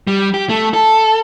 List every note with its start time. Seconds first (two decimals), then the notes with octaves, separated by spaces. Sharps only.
0.07 G3
0.34 G4
0.49 A3
0.74 A4